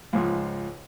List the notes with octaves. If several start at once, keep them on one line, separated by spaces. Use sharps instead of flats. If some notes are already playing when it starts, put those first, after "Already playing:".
C#2 G#2 F3